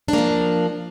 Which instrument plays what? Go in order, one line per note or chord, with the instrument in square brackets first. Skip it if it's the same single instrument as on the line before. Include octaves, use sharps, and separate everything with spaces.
[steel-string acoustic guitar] D4
A#3
F3